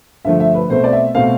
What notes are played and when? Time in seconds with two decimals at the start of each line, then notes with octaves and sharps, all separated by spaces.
0.25 G2 D3 F3 A3 E5
0.40 E5
0.55 B4
0.69 B2 A3 C4 C5
0.84 D5
0.92 E5
1.15 B2 A3 C4 F5